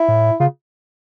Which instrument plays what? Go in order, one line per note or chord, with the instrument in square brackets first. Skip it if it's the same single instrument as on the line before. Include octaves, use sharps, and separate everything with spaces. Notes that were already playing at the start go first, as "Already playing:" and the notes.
Already playing: [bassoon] E4
[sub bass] A2
[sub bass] C#3 [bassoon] F4